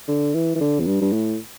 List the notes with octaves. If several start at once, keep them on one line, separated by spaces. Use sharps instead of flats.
D3
E3
E3
D3
E2
G2
G2
A2